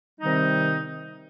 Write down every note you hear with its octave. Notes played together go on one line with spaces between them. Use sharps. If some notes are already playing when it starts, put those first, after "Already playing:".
C3 D#3 G3 C4 D#4